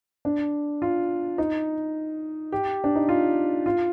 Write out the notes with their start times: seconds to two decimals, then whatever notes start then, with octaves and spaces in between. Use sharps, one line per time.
0.25 D4
0.82 F4
1.38 D#4
2.52 G4
2.84 D4
2.95 D#4
3.09 F4
3.66 F4